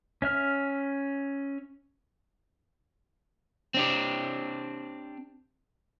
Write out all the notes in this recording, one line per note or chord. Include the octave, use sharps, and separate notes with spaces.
C#4 E5 F6
C4 D4 G4